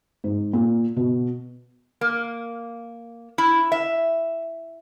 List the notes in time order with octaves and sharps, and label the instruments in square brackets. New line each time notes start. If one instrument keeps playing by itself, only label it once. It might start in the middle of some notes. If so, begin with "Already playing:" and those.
[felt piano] G#2
A#2
B2
[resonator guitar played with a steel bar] A#3
E4
E5